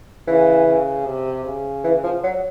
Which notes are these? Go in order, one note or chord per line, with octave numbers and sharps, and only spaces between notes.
C#3 E3
C#3
C3
C#3
E3
F3
F#3